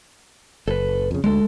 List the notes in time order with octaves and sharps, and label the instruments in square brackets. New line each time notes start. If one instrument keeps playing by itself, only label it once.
[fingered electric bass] F#1 [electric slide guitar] A4 B4
[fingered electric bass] F2 C#3
[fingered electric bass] D2 [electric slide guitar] G#3 A4